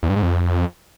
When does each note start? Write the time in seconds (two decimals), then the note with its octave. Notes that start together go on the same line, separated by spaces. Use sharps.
0.03 E2
0.09 G2
0.16 G#2
0.23 F2